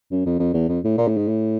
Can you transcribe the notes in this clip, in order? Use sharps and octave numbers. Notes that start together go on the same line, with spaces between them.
F#2
F2
F2
E2
F2
A2
A#2
A2
G#2
A2